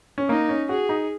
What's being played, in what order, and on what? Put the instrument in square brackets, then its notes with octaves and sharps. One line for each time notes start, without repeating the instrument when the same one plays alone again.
[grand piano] C#4
[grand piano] A#3 [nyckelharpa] D#4
[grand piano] C#4
[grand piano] F#4 [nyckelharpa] G#4
[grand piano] D#4